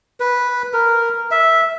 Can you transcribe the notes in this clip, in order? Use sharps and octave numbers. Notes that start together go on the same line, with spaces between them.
B4
A#4
E5